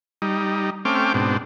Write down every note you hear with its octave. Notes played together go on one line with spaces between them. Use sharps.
G3 D#4
A3 C4 C#4 G5 D6 F6
G#2 B2 C4 D4